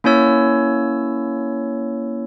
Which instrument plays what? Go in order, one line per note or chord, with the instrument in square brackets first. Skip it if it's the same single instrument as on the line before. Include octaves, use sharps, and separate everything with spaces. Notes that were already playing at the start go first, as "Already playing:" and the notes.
[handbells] A#3 C#4 E4 C#5 E6